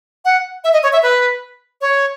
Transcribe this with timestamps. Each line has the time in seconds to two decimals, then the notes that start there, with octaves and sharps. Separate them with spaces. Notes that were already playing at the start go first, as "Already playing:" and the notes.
0.25 F#5
0.64 E5
0.73 D#5
0.83 C#5
0.93 E5
1.03 B4
1.81 C#5